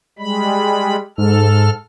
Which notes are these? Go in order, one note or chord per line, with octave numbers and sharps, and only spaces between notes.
G3 G#3 B5
G#2 A4 F6